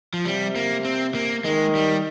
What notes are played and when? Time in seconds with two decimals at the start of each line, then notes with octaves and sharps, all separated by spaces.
0.14 F3
0.25 C3 G3
0.56 A#3
0.85 C4
1.15 A#3
1.44 D#3 G#3
1.75 G3